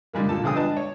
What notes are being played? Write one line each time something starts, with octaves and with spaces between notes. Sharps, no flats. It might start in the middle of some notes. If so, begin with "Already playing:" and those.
D3 D#3 G3 G#3 A#3
A#2 A4 A5
D3 F3 G#4 G5 D#6
D4 B4 D#5 A5
C#5